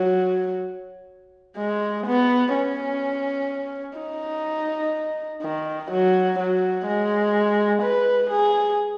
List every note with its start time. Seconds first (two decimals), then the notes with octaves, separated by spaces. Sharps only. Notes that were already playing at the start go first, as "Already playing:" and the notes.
Already playing: F#3
1.57 G#3
2.06 B3
2.53 C#4
3.98 D#4
5.42 D#3
5.90 F#3
6.39 F#3
6.86 G#3
7.82 B4
8.30 G#4